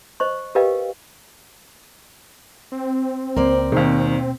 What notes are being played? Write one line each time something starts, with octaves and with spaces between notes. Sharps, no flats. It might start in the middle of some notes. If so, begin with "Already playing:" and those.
C5 D#5 C#6
G4 A#4 B4 D#5 F5 G5
C4
C#2 A#3 A#4 C5 D5
D#2 B2 D#3 A#3